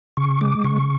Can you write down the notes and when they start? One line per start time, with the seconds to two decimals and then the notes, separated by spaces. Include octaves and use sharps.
0.17 C#3 C#6
0.41 G#3 D6
0.64 C#3 C#6